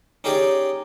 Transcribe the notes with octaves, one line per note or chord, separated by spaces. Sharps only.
C#4 D#4 G4 G#4 D5 D#5